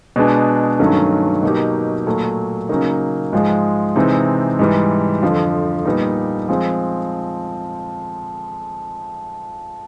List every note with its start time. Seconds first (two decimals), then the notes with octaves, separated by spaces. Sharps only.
0.16 B2 G#3 B3 D4
0.79 G2 D#3 F#3 A3 C#4
1.43 B2 F#3 A#3 D#4 G4
2.07 A#2 F#3 A3
2.69 C#3 F#3 A#3 D#4
3.33 G#2 F3 G#3
3.96 C3 E3 G#3 C4 D#4
4.59 G#2 E3 G3
5.23 F2 D3 F3
5.85 A#2 G3 B3 D#4
6.49 F3 G#3 C4